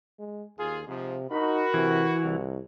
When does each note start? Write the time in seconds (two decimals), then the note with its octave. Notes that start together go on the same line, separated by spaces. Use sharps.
0.19 G#3
0.59 D#2 F4 G#4
0.88 G#2 C3 F3
1.31 D#4 F#4 A#4 B5
1.74 C3 E3
2.24 C2